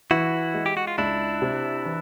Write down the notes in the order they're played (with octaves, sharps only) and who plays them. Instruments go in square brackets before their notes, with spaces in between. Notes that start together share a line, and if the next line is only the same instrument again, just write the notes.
[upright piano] E3 [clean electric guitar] E4 F#4
[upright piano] G#3
[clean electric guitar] G4
F#4
F4
[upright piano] C#2 [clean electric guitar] D4 E4
[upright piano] C3
E3